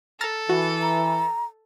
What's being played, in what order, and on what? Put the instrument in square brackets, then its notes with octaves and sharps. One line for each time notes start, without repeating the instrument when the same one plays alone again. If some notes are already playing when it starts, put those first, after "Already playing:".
[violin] A4 [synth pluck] A#5 F6 A6
[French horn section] E3 [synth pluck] F#4
[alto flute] A#5